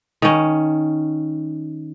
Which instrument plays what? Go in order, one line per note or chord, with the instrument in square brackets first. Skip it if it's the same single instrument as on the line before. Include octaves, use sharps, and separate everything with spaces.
[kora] D#3 C#4